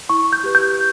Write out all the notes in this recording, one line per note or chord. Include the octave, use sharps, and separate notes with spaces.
E4 C#6
G6
G4 B4
G6